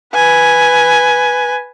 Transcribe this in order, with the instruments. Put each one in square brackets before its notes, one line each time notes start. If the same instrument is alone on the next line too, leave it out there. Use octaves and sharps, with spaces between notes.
[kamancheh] B4 G#5